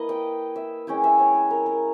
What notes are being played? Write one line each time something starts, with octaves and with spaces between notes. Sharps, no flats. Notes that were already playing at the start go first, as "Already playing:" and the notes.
Already playing: A#3 E4 B4 D#5
G5
E5
G#3 C#4 E4 G5
E5
C#5
B4
A#4
A#4